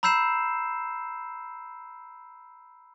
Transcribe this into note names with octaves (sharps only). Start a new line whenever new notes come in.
A#5 B5 E6 G6 C7 E7